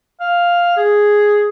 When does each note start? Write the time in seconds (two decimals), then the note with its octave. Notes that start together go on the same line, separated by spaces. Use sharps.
0.20 F5
0.77 G#4